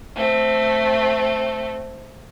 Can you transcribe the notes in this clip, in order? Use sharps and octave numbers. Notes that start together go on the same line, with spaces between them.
A3 C4